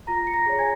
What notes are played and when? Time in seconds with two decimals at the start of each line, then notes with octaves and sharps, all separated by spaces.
0.07 F4 A#5 A#6
0.27 C#7
0.34 A#5 A#6
0.46 G#4 C#5
0.58 G#5 G#6